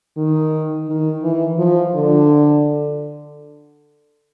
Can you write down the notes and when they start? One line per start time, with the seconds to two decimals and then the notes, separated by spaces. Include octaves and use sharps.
0.17 D#3
0.88 D#3
1.23 E3
1.58 F3
1.95 D3